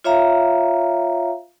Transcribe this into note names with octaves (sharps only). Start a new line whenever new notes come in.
F4 C#5 E5 F5 A#5